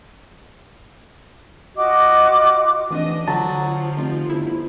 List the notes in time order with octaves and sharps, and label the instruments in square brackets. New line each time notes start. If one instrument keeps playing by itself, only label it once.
[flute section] F4 F#4 D#5 D6
[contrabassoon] F1 [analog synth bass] E3 [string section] D4 D#5
[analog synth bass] D3 [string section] F3 [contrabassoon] F#3 [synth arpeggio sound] A5
[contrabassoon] F1
[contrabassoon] G1 [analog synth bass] E4